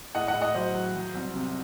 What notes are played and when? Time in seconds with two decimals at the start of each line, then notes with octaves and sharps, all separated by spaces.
0.15 A2 D#5 F#5
0.28 D#5 F#5
0.34 A2
0.42 D#5 F#5
0.54 F#3 C5 D#5
0.75 F#3
0.96 F#3
1.15 C2
1.35 C3